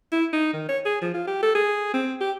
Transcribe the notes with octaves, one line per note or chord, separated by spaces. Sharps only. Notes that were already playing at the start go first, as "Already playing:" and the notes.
E4
D#4
D#3
C#5
G#4
F3
F4
G4
A4
G#4
C4
G4